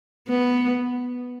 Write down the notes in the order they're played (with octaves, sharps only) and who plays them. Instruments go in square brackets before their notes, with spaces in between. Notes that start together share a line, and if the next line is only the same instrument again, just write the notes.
[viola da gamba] B3